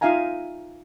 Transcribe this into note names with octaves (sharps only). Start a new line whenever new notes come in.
D#4 F4 E5 F5 G#5 A#5